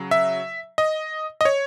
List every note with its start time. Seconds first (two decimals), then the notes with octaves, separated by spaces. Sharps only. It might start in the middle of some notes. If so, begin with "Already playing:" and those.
Already playing: C#3 F#3
0.11 E5
0.78 D#5
1.41 D#5
1.45 C#5